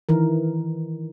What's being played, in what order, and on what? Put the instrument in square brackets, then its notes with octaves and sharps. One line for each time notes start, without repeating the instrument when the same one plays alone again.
[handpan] D#3 E3 A#4